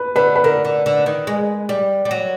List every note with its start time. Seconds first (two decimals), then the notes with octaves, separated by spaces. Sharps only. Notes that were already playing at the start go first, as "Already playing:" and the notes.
Already playing: B4
0.16 D3 B4
0.35 B4
0.44 D3 A#4
0.65 D3
0.86 D3
1.06 D#3
1.27 G#3
1.69 G3
2.05 G3
2.11 F#3